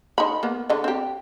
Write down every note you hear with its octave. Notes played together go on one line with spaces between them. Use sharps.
D#4 B5
A#3 B3
D3 D#5
C4 G4